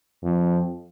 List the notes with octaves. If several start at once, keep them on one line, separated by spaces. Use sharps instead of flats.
F2